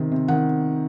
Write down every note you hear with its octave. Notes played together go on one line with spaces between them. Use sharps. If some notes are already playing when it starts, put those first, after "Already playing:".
Already playing: C3 D#3
C3
D#3 F#5